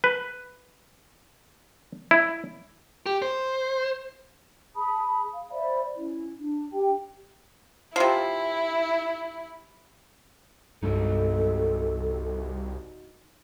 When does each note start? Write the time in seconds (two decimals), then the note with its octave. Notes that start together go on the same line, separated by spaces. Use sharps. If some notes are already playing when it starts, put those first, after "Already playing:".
0.04 B4
2.11 E4
3.06 G4
3.22 C5
4.76 G#4 A5 B5 D#6
5.34 F5
5.52 C5 D5 E5 B5
5.96 C#4 E4
6.37 D4
6.72 D4 G4 G5
7.96 C3 F3 E4
10.83 C2 G2 G#3 D4 D#4 F#4 A4 D#5